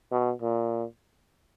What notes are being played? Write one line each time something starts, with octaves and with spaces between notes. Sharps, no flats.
B2
A#2